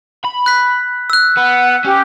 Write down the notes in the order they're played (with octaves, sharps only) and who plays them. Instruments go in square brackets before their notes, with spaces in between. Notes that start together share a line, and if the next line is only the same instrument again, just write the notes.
[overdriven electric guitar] B5
[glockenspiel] F#6 B6
E6 F#6
[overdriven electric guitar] B3 [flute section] F#5
[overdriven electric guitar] C#4 [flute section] G4